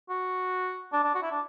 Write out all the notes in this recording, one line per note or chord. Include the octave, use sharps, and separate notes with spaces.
F#4
D4
D4
F#4
E4
D4